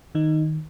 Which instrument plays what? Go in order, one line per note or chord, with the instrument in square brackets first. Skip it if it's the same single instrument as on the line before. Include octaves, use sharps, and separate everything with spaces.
[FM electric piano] D#3 D#4